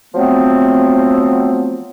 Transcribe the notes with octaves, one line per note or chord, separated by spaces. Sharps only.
F3 F#3 A3 B3 C4